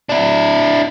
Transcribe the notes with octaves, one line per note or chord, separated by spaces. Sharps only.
D4 E4